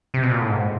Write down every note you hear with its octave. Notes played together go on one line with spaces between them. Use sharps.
C3
B2
A#2
A2
G#2